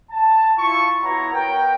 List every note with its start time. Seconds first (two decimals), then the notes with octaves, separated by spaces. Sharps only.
0.11 A5
0.55 E4 F4 A5 C#6
1.02 B3 E4 F#4 C#5 A#5
1.33 B3 A#4 C#5 G5